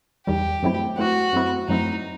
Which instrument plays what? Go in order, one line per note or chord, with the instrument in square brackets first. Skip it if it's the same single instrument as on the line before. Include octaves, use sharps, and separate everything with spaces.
[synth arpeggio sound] E2 D#3 G3 [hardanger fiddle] G4
[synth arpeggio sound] F#2 F#3 A3 C4 E4
[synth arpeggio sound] F#2 F#3 A3 C4 E4 [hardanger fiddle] F#4
[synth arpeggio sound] F#2 F#3 A3 C4 E4
[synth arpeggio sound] F#2 F#3 A3 C4 E4 [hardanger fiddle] D#4